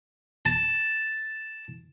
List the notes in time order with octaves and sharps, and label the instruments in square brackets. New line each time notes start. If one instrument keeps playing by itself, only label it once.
[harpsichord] A5